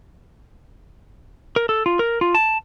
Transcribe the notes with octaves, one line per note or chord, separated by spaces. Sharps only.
A#4
A4
F4
A#4
F4
A5